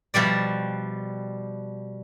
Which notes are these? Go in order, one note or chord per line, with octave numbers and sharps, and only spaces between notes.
B2 F3 G3 D5